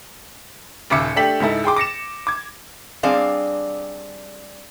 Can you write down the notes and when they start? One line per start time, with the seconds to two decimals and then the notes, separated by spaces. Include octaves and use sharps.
0.90 D#1 C#3 E5 D6 C#7
1.16 A3 D4 G4 A4 B6 F#7
1.40 C#2 G#2 E4 A4
1.64 G#4 G5 C6 D6
1.76 D6 A#6 C#7 E7
2.27 D6 G#6
3.03 G3 C4 D4 G#4 D5 F5